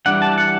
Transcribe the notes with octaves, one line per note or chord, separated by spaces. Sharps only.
E3 G3 D4 F#5
A5
F#5